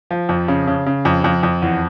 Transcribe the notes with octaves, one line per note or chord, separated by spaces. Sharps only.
F3
F2
C#3
C#3
C#3
F2
F2
F2
E2